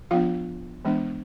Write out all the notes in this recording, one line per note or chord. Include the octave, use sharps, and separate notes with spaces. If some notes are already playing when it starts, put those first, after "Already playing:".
F3 B3 D4 F4 F5
E3 G#3 B3 D4